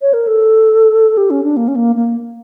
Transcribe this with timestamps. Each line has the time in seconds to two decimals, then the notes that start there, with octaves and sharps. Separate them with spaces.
0.02 C#5
0.13 A#4
0.27 A4
1.17 G4
1.30 C#4
1.44 D4
1.57 A#3
1.68 C#4
1.76 A#3
1.96 A#3